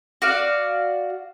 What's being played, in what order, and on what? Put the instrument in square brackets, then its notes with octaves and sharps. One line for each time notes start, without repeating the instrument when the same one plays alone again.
[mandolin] F#4 D5 F5